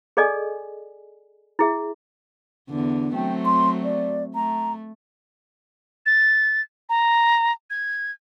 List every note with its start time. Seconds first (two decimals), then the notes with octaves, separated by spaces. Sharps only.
0.17 G#4 A4 D5 D#5 G#5
1.59 E4 G#4 E5
2.69 E2 D3
3.15 F#3 A3 C4 G5
3.45 C6
3.84 D5
4.35 A3 A#5
6.06 A6
6.89 A#5
7.70 G#6